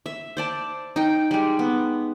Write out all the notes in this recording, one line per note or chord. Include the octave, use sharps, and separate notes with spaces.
E5
C5 D5 A5
D#4 G5
G3 G#3
B3